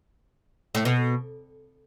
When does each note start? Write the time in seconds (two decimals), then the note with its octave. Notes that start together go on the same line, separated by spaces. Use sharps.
0.75 A2
0.85 B2